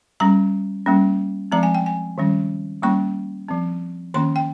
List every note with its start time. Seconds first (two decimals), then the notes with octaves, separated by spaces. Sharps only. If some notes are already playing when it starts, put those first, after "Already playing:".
0.20 G3 C#4 A#5
0.86 G3 A#3 C#4
1.52 F3 G#3 C4 A#5
1.63 G#5
1.75 G5
1.86 G#5
2.18 D#3 G3 C#4
2.83 G3 A#3 C#4 C#6
3.48 F3 C4
4.14 D#3 A#3 C#4 C6
4.36 G5